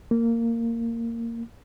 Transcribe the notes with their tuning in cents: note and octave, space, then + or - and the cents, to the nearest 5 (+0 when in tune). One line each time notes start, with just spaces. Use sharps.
A#3 -15